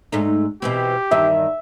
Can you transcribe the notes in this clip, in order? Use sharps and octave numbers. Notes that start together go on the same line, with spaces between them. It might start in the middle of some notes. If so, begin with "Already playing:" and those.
G#2 A3 D#4
B2 E3 C4 G4
E2 G2 D#3 E5